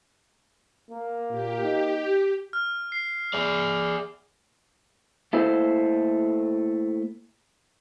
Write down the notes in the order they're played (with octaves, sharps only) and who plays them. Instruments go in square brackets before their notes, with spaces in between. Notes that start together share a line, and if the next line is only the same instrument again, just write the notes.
[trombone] A#3
[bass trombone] A#2 [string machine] G4
[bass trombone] D#4
[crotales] F6
C7
[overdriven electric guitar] G#4 D5
[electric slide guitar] A3 A#3 E4 A4 C5